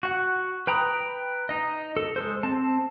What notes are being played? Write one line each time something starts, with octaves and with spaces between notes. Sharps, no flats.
F#4 F#5
B4 G5 A#5 B5 D#6
D#4 D#5
A4
G#3 A4 C5
C4 A5